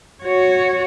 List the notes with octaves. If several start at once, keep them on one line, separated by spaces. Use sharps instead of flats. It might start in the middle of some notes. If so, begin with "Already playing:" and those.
F#4 C#5